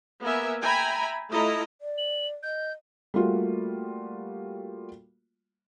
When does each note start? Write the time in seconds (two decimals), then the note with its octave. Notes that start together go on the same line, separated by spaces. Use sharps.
0.22 A#3 B3 A#4 E5 G#5
0.62 E5 G5 G#5 A#5 B5
1.30 A3 E4 F4 A4 D#5 A#5
1.81 D5
1.98 F#7
2.43 D#5 G6
3.14 G3 A3 A#3 F4 F#4